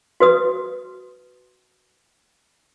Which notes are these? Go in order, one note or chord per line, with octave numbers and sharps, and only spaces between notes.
F#4 B4 D#6